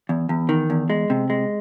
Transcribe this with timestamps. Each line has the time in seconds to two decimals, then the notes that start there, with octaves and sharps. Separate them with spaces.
0.09 E2
0.29 E2
0.49 D#3
0.70 E2
0.90 G#3
1.10 C3
1.30 G#3